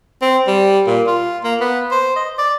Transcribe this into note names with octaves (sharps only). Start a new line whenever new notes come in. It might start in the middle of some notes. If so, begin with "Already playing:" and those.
C4
G3
A#2
F4
A#3
B3
C5
D#5
D5